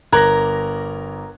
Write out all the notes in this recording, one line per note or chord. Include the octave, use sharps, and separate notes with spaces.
G1 A#4 A#5 D6 F#6 G#6 A#6